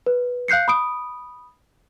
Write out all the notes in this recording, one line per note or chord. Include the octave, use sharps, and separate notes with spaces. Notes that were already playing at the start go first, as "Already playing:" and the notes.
B4
F5 F#6 G6 C7 C#7
B5 D#6 D7